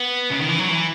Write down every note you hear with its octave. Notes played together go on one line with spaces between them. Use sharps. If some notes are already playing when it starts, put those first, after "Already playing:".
Already playing: B3
C#3
D#3
E3
F#3
E3